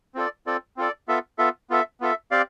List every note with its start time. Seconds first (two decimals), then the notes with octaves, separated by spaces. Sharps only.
0.15 C4 F4 A4 D5
0.46 C4 F4 A4 D5
0.77 C4 F4 A4 D5
1.08 B3 F4 A4 E5
1.38 B3 F4 A4 E5
1.70 B3 F4 A4 E5
2.00 B3 F4 A4 E5
2.31 C4 G4 D5 F5